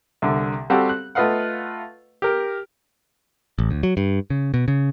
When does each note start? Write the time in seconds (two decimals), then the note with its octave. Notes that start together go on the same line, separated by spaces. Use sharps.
0.22 C2 D3
0.70 G3 C4 F#4 G4 A4 F5
0.89 F#6
1.15 A3 F4 B4 D#5 F5 F#5
2.22 G4 A#4
3.59 A1
3.71 D2
3.83 F#3
3.97 G2
4.30 C#3
4.54 B2
4.68 C#3